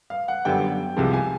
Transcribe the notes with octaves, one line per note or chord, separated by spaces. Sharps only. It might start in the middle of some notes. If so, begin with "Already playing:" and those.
F5
F#5
F#2 D3 G3 B3 G5
C2 C3 F3 G#3
G#5